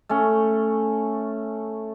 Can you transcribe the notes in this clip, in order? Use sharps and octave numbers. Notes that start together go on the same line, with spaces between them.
A3 C#4